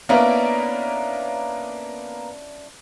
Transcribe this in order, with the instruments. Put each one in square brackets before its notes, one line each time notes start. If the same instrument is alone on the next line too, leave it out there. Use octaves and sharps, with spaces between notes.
[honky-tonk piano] A#3 B3 A#4 [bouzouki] C#4 D4 E4